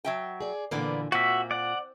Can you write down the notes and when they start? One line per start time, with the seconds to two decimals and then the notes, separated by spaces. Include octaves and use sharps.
0.05 F#3 E5 G5
0.40 G#4 D5
0.71 A#2 D3 E3 A#3 B3 D5
1.12 A#2 C4 F#4 E5
1.51 D5 F#5